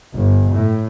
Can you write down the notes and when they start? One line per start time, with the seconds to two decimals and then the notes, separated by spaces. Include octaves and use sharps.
0.13 G1
0.52 A2